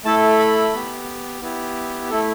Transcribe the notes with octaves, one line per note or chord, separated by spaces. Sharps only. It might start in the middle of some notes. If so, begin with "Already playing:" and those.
A3 E4 A4 A5
B5
B3 G4
B3 E4 G4
A3 E4 A4